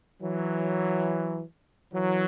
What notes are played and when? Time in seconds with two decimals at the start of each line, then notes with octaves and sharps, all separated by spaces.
0.21 E3 F#3
1.93 E3 F#3